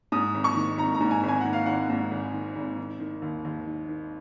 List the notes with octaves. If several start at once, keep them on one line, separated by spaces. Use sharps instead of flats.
G#2 D#6
G#1
C#6
D#3
G#1 A#5
A#5
G#2
G#5
G#1
G#5
D#3 F#5
F5
G#1 F#5
G#2
G#1
D#3
G#1
D#3
D#3
D#2
D#2
D#3
D#3